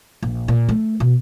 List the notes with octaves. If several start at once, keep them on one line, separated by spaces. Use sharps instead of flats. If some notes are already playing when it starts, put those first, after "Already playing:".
A#1
A#2
A3
B2